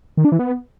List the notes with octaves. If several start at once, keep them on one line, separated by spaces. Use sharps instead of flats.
D#3
D4
E3
B3